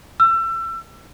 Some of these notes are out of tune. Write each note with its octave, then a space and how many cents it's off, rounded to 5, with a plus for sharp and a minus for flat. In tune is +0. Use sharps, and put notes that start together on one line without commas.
E6 +30